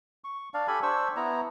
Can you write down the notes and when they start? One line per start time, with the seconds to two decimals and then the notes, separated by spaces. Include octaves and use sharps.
0.24 C#6
0.54 D4 D5 F5
0.68 G4 A4 G#5 B5
0.83 D4 C5 C#6 E6
1.16 B3 E4 A#5